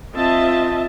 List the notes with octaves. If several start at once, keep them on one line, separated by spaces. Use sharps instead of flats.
C4 F4 D#5 E5 A5